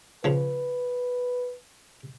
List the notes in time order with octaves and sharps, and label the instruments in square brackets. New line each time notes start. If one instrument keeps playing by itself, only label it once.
[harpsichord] C#3 F3 [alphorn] B4